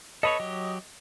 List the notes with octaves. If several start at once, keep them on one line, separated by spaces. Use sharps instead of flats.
A4 B4 C#5 D#5
F#3 G4